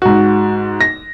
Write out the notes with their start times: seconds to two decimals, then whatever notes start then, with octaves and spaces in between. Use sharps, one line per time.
0.02 G#2 F#4
0.81 A#6